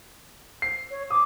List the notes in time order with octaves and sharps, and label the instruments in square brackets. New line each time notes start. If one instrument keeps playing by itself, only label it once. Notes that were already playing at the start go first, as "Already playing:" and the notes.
[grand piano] C7
[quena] C#5
[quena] D6 [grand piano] D#6